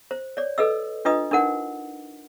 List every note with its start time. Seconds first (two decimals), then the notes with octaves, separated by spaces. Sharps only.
0.11 C5
0.37 C#5 D5
0.58 A4 B4 D#5 E6
1.05 D4 F4 B4 D#5 D#6
1.31 D4 D#4 A#4 F#5